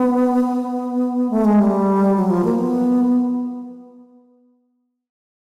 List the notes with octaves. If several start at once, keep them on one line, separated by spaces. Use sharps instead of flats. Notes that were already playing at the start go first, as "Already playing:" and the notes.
Already playing: B3
B3
A3
G#3
G3
F#3
F3
A#3
B3